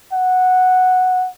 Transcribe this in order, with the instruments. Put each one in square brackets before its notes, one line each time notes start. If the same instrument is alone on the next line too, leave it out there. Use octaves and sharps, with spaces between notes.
[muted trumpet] F#5